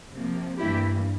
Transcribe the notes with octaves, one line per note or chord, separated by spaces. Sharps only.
C3 F3 A#3
G2 E3 G3 A#3 E4 G4